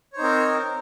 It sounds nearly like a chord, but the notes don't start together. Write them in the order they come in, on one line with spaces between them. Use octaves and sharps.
C#5 C5 D#4 C4 A#4